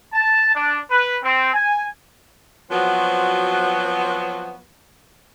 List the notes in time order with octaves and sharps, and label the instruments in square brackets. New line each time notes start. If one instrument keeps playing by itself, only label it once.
[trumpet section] A5
D4
B4
C4
G#5
[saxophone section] F3 F#3 B3 C4 F#4